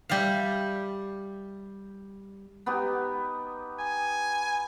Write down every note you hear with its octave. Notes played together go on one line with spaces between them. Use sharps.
G3 G4 E5 F5
B3 D#4 G4
G#5